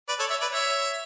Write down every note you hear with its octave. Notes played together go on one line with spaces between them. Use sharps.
B4 D5
A4 C#5
C#5 E5
B4 D5
C#5 E5